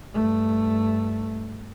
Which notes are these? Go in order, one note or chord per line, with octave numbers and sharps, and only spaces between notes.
G2 A3